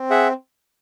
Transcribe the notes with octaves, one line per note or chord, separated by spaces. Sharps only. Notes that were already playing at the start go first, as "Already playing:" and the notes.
Already playing: C4
G#4 E5 F#5